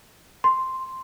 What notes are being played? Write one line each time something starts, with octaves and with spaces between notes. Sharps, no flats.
C6